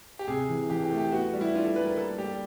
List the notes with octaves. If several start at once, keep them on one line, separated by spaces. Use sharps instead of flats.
G4
C3 G#4
E3
E3 G4
G4
A3
G4
B3 F#4
G3
E4
D4 F4
A4
G3 B4
A#4
A#3 A4
G3 G4